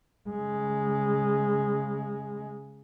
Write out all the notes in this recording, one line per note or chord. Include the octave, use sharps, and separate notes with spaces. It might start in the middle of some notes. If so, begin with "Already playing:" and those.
C#3 G#3